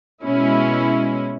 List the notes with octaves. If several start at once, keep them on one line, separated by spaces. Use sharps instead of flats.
B2 G#3 C#4 E4